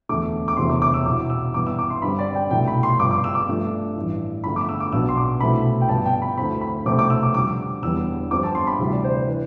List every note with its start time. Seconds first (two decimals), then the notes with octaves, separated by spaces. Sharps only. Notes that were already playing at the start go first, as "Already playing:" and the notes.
0.09 E1 D2 D3 A3 D6
0.48 D6
0.57 E1 D2 C3 E3 A3 C6
0.69 D6
0.82 D6
0.94 E6
1.06 C2 B2 B3 E4 D6
1.30 E6
1.54 G2 E3 B3 E4 D6
1.66 E6
1.79 D6
1.90 C6
2.02 G2 D3 G3 C4 B5
2.19 D5
2.35 G5
2.51 C2 B2 A3 E4 G5
2.67 B5
2.83 C6
2.99 G1 G2 F3 D6
3.11 D6
3.24 E6
3.35 D6
3.48 G2 F3 A3 D4
3.96 A1 G2 E3
4.44 G1 F2 D3 A3 B5
4.56 D6
4.69 E6
4.80 D6
4.92 B1 B2 B3 D4 E6
5.09 C6
5.17 D6
5.40 C2 B2 A3 C4 E4 B5
5.81 G5
5.89 G2 D3 F3 B3 A5
6.06 G5
6.22 B5
6.37 D2 D3 A3 C4 E4 B5
6.61 B5
6.86 C2 B2 A3 C4 D6
6.99 D6
7.10 E6
7.23 D6
7.34 F2 D3 G3 D6
7.82 E1 E2 D3 G3 B3 E6
8.31 G1 F2 D3 G3 C4 D6
8.43 A5
8.55 C6
8.67 B5
8.79 D2 C3 E3 G3 D4
8.91 D5
9.04 C5
9.16 C5
9.27 E3 B4